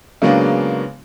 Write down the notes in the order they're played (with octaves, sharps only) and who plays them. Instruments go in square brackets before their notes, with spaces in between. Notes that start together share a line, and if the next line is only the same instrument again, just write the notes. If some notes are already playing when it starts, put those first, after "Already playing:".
[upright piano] C#3 F#3 G#3 A#3 B3 D4